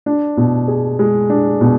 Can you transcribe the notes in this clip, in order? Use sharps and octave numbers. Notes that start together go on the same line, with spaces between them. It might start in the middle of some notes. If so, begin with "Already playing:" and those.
D4
B2
G#4
G#3
D4
B2